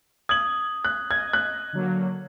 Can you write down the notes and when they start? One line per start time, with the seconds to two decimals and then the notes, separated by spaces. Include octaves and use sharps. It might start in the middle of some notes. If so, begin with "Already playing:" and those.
0.29 D#6 G#6 F#7
0.85 F#6
1.11 D#5 G#6
1.33 F#6
1.73 D3 F#3 A#3